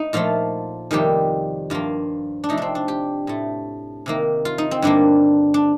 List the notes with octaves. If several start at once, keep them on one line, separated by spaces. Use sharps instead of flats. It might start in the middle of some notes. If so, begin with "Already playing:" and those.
Already playing: D#4
A#2 F3 A3 F4
F2 C3 D#3 G3 A#3 G4
G2 F3 A#3 F4
D4
C3 F3 A3 D#4
C4 D4
D4
G4
A2 A3
C3 D#3 A#3
F4
D#4
C4
G2 D3 G3 A#3 D4
D4